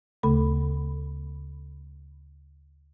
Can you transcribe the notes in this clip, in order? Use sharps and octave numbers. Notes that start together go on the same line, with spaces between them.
D2 C#3 A3 A4 B5